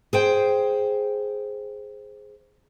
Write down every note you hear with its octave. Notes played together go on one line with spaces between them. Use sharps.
G#4 C5 G5